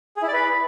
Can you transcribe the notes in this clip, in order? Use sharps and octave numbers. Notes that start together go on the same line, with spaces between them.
G#4
E4
D5
B4